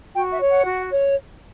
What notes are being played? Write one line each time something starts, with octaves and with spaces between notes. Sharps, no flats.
F#4 G5
E5
C#5
F#5
F#4
C#5